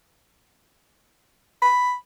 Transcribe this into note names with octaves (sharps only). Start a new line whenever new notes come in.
B5